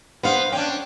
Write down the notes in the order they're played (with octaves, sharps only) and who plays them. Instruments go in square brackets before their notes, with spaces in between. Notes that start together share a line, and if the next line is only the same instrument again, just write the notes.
[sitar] B3 [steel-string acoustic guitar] D4 C5 F5
[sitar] C#4 D4 [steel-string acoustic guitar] G5